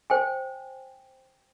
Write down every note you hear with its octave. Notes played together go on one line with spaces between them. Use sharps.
C5 G5 G#5